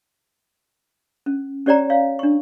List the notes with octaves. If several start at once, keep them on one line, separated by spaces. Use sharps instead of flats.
C#4
C#4 G4 C#5 D5 G5 A#5
C#5 F5
D4 C#6